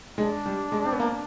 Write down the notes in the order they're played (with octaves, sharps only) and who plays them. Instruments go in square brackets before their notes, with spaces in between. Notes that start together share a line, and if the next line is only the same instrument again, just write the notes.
[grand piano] G#3 [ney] E4
[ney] D4
[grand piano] G3
G#3
C4
B3
A#3